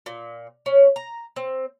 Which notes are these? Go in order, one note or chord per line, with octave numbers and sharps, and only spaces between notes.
A#2
C#4
A#5
C4